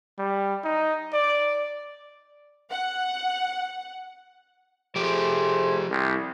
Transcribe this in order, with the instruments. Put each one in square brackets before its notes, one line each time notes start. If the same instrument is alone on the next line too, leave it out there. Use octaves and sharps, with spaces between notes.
[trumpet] G3
D#4
D5
[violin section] F#5
[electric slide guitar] F3 G4 [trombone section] A3 G#4 C5
[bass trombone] C2